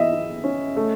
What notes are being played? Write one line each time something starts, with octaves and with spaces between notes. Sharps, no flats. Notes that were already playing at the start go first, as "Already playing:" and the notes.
Already playing: E3 E4 D#5 E5
E4
C#4
A3